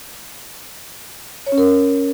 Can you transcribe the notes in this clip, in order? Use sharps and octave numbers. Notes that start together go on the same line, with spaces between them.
C#5
C#4
A#4